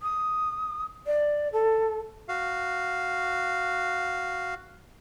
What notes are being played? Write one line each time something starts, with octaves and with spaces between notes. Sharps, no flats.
D#6
D5
A4
F#4 F5